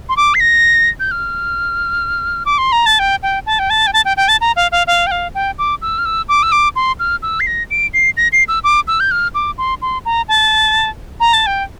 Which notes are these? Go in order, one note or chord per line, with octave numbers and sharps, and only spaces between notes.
C6
D6
C7
A#6
G6
F6
D6
C6
A#5
A5
G5
G5
A5
G5
A5
G5
A5
G5
G5
A5
A#5
F5
F5
F5
G5
F5
G5
D6
E6
F6
E6
D6
E6
D6
C6
F6
E6
C7
A#6
D7
C7
A#6
C7
E6
D6
E6
G6
F6
D6
C6
C6
A#5
A5
A#5
A5
G5